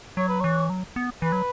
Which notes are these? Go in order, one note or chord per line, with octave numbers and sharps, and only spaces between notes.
F#3 C#5
B4
E3 C#5
F#3
B3
E3 B4
F#3